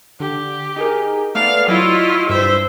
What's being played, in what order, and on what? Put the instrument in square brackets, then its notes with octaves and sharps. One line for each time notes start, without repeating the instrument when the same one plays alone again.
[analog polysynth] D3 [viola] G4
[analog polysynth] D#4 G#4 A#4
[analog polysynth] A3 B3 D5 [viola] F5
[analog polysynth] F#3 D#5 C#6 [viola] E4 F4
[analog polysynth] G2 [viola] C5 E5